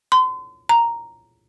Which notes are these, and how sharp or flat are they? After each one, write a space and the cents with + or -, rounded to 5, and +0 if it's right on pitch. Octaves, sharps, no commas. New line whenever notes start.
C6 -40
A#5 +0